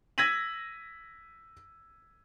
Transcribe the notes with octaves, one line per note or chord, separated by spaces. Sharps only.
E6 G#6 A#6 B6 D#7 F#7